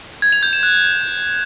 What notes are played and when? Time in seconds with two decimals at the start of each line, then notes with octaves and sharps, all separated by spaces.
0.22 G#6
0.32 F7
0.43 G6
0.53 E7
0.63 F#6